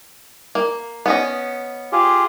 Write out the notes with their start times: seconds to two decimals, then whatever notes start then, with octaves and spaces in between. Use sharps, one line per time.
0.55 A#3
1.06 B3 C#4 D#5
1.92 F4 G4 G#4